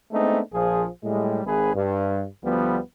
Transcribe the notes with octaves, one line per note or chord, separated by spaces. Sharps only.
G#3 A3 B3 C4 D4 D#4
A#1 F3 G#4
A2 G3 G#3
G#1 G#4 B4
G2
D2 F3 G3 B3